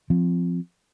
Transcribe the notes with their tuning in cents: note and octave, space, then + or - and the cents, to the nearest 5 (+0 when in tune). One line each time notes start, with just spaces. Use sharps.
F3 +0 C4 -5